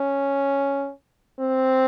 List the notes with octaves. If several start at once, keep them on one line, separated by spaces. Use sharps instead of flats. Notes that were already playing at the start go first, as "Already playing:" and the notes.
Already playing: C#4
C4